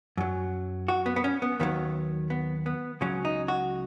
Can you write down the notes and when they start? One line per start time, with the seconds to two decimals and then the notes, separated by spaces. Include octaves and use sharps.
0.17 F#2 F#3
0.88 F#4
1.06 B3
1.16 B3
1.24 C#4
1.42 B3
1.60 D#2 D#3 F#3 B3
2.30 B3
2.66 B3
3.01 C#2 C#3 F#3 C#4
3.25 D#4
3.48 F#4